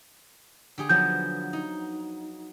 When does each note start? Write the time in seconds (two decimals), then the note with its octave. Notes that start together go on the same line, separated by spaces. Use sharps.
0.78 D3 G4 G#4
0.89 F3 F#3 B3 G6
1.53 D#4